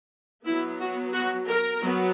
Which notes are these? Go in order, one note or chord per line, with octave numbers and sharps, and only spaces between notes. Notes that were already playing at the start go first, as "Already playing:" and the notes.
F#3 B3 E4
F#4
F#4
A#4
F#3 B3